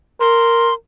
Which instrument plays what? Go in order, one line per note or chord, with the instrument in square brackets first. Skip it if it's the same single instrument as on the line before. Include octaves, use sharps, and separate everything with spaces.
[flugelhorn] A#4 [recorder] C6